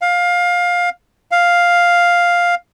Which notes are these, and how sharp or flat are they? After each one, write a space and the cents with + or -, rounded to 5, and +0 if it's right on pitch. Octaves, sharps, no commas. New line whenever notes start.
F5 +20
F5 +5